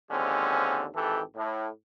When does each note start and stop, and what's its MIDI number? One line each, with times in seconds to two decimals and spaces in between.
0.11 0.86 39
0.11 0.86 50
0.11 0.86 53
0.11 0.86 56
0.11 0.86 60
0.11 0.86 61
0.96 1.20 32
0.96 1.20 52
0.96 1.20 67
0.96 1.20 69
1.36 1.66 45